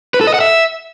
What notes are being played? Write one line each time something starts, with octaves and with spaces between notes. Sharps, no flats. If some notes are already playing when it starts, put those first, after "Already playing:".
B4
A4
D#5
F#5
E5